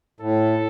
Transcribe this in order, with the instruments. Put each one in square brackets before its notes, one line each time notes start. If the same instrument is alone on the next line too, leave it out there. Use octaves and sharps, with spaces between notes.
[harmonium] A2 [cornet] A4